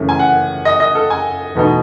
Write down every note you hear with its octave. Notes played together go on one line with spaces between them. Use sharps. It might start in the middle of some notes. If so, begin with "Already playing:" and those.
Already playing: F#2 C#3 E3 A3 C#4
G#5
F#5
D#5
D#5
A4
G#5
E2 B2 A3 D#4